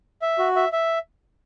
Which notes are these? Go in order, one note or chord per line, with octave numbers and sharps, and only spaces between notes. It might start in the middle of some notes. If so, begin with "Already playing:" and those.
E5
F#4
E5
E5